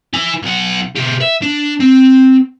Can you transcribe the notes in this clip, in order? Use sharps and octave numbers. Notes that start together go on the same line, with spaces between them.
E4 G#5
B1 F#5
B2 G4
E5
D4
C4